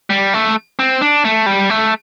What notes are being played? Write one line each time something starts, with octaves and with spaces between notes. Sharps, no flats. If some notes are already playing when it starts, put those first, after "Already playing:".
G3
A3
C4
D4
A3
G3
A3